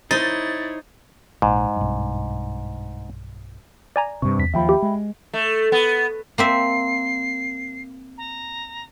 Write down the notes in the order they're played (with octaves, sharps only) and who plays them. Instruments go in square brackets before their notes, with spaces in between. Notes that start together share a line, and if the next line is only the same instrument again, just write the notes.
[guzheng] D#4 [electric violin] E4 C#5 [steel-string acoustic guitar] C5 [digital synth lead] A6
[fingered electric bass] A#1 [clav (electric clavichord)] G#2
[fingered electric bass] B1 G2
[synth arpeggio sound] D5 G#5 A#5
[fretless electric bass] G2 C3 [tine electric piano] C#6
[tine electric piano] E2 B6
[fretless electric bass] D#2 F3 [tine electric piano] E5 G5 B5
[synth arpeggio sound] G4
[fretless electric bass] G#3
[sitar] A3
B3
[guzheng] A#3 C4 E5 [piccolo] C7
[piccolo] A#5